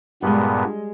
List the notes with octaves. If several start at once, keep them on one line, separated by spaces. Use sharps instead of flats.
G2 A#2 G3 G#3 B3